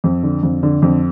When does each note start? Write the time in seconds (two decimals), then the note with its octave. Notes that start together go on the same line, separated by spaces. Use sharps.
0.04 F2
0.23 D3
0.43 F2
0.63 D3
0.82 F2